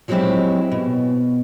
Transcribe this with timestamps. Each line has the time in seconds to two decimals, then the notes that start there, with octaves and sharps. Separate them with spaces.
0.08 F3 F#3 G#3 C4 E4 G4
0.72 B2